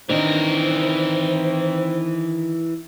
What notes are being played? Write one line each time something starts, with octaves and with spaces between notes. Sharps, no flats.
D#3 E3 C4 D4 A#4 D5